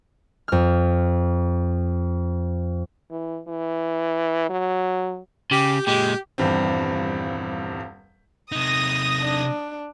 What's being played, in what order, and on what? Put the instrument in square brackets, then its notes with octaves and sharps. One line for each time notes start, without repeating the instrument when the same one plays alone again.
[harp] F2 F6
[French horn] E3
E3
F#3
[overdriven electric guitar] C#3 [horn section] G4
[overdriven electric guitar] A#2 G#3 [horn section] G4
[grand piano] D#1 E2 G2 C4
[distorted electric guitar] C3 D#4 [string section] D#6 A#6
[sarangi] D4